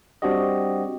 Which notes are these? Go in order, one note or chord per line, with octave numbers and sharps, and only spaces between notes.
G3 C4 D4 F#4 G4 D#5